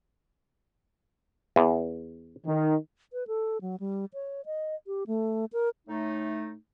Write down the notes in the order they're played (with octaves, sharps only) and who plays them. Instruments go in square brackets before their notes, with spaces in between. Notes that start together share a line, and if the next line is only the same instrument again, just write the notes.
[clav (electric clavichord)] E2
[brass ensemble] D#3
[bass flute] B4
A4
F#3
G3
C#5
D#5
G4
A3
A#4
[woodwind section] A2 A3 D#4